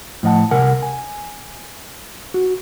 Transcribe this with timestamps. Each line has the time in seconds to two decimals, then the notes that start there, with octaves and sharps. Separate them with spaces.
0.23 A2 F3 D#5 F#5 A5
0.51 C2 C3 A#4 F#5 G#5
0.83 G#5
2.34 F#4